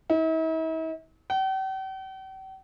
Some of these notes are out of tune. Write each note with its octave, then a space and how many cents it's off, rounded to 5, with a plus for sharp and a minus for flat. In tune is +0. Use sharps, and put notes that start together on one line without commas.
E4 -45
G5 -45